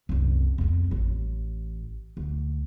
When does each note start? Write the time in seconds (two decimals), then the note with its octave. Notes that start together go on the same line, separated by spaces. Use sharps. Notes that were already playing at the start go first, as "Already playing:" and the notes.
0.09 C2 F#2
0.58 F2 G#3
0.91 A1
2.17 D2